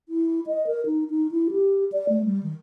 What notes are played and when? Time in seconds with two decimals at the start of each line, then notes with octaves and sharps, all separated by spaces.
0.09 E4
0.47 D#5
0.67 A#4
0.86 D#4
1.10 D#4
1.31 E4
1.51 G4
1.92 D5
2.09 A3
2.25 G3
2.43 D#3